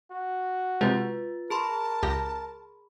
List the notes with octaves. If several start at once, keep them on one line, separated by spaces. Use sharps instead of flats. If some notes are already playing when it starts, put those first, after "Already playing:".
F#4
C3 G#3 F4 B4 A6
G#4 A#4 A5 B5 C6
C#2 G4 A#6